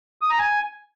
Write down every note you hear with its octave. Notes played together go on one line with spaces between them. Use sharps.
D#6
A#5
G#5